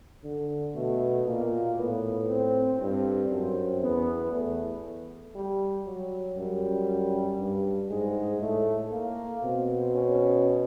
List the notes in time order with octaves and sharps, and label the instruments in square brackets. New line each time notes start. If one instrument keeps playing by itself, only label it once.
[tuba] D3
[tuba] B2 [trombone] A3
[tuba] A#2 [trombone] A#3
[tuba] A2 [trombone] B3
[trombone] C4
[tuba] G2 [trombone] C4
[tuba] F#2
[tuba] E2 [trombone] B3
[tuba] E2 [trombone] A3
[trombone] G3
F#3
[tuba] F#2 [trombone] G3
[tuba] G2
[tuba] G#2 [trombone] G#3
[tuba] A2 [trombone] A3
[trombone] A#3
[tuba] B2 [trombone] C4
[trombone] C#4